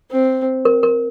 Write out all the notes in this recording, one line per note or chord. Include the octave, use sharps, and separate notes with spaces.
C4
A#4
A#4